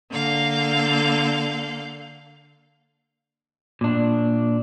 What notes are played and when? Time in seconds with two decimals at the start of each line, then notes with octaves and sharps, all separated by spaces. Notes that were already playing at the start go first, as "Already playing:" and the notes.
0.10 D3 A#3 F5 G6
3.81 A#2 D4